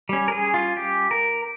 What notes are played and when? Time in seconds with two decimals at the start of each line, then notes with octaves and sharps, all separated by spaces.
0.09 G3 C#4
0.28 A#4
0.32 G#4
0.54 F4
0.77 G4
1.11 A#4